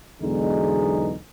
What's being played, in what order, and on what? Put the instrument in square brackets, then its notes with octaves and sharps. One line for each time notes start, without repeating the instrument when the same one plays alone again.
[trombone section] B1 E2 D3 G#3 D#4 G#4